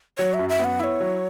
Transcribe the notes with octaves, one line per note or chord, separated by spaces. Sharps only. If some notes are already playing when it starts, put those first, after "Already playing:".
F#3 C#5
E5
F#2
E5
B3
F#5
E4 C#5 E5
F#3